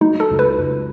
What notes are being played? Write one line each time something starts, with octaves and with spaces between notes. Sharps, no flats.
F#3 D#4
A4
C#2
B4
C#2